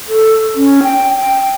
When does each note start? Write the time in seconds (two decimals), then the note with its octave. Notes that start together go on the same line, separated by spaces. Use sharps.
0.09 A4
0.56 C#4
0.83 G5
1.18 G5